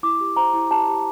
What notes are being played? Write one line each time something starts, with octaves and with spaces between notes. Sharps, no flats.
E4 D6
G4
C5 A#5
E4
G4 A5
G4